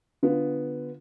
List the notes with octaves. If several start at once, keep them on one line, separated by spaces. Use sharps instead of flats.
D3 B3 F4